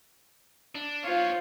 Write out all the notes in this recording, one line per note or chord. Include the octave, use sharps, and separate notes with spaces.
D4
B3 F4 C5 C#5